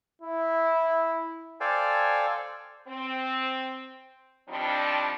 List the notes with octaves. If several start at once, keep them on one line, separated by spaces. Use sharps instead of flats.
E4
A4 C5 D5 F5 G5 G#5
C4
D#3 F3 G3 C4 D4